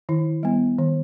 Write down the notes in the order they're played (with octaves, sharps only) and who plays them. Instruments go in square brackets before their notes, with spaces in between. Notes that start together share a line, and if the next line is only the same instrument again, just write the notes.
[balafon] D#3 E4
G3 B3
D#3